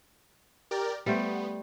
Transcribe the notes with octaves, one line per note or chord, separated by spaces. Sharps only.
G4 A#4 D5
G3 A3 B3 C5